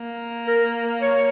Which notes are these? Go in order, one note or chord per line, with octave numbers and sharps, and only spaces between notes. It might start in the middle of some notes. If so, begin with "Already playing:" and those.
Already playing: A#3
A#4
C#5